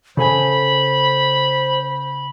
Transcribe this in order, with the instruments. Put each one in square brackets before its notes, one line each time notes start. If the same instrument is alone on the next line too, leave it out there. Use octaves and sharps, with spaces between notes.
[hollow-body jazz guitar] C#3 A4 G#5 [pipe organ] C5 [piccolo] B5